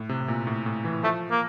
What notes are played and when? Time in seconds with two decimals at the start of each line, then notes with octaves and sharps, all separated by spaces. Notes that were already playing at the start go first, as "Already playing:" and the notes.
Already playing: A2
0.09 C3
0.20 A2
0.28 A#2
0.47 A2
0.66 A2
0.85 E3
1.03 F3 A3
1.31 A#3